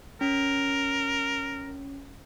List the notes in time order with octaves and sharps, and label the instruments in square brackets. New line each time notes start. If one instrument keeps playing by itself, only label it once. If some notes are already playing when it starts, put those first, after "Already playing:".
[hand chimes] C#4 [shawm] A#4